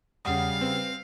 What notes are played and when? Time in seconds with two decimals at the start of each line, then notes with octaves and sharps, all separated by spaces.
0.25 E2 C#3 G3 F5 F#5 D#6
0.61 C4 B4